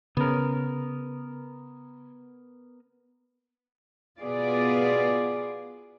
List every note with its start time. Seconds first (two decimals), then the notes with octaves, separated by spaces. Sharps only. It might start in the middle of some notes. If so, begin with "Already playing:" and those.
0.17 C#3 B3 A#4
4.20 B2 B3 F4 G#4 D5